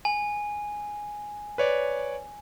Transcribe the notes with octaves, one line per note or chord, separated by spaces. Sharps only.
G#5
B4 C#5 D5